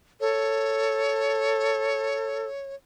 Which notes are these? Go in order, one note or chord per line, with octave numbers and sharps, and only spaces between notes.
A4 C#5